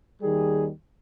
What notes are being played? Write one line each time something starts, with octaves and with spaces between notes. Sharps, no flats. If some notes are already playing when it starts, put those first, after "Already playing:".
D#2 D#3 G3 G#4